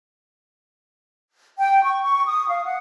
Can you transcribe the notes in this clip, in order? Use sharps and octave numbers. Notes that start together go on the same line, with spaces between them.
G5
C#6
C#6
D#6
F5
F#5